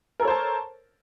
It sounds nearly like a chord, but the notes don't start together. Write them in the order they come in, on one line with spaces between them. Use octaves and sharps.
A#4 A4 C#5 C5 A5